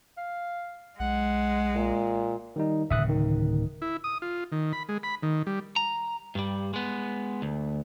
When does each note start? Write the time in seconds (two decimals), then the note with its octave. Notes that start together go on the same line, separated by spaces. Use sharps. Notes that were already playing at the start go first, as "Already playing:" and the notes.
0.17 F5
1.00 B1 G#3 F#5
1.76 A#2
2.56 D#3 G3 D#4
2.90 D1 C#3 E5 D#6 F#6
3.09 D#3
3.82 E4
4.04 D#6
4.22 F4
4.52 D#3
4.73 B5
4.89 G#3
5.03 B5
5.23 D#3
5.47 G3
5.76 A#5
6.35 G2 G3
6.74 G#3 B3
7.42 D2